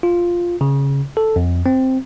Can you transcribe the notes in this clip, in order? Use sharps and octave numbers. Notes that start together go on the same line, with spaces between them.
F4
C#3
A4
F2
C4